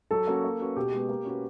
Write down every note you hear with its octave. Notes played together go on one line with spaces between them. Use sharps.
F#3 A4
A#3 C#4 F#4
A#3
C#4 F#4 B4
B2 G4
G#3 B3
A#3
C#4 F#4 B4